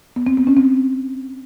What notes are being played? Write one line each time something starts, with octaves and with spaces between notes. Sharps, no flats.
B3
C4
B3
C#4
C4